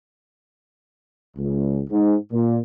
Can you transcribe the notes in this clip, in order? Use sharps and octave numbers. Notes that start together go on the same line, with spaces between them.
C#2
G#2
A#2